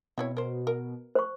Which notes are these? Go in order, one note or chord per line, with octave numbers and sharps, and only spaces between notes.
B2 C4 E4 C#5
A#4 C5
A#4
C5 C#6